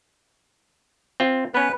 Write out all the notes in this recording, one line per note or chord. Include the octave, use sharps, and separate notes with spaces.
C4 F4
B3 C#4 B4